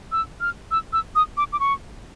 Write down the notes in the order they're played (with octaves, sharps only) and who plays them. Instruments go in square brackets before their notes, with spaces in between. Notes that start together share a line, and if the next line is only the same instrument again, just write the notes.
[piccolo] E6
F6
E6
E6
D#6
D6
D6
C#6